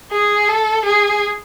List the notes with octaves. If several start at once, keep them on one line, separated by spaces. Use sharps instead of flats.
G#4
A4
G#4